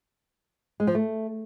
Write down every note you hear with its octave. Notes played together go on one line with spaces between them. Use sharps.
G#3
F3
A3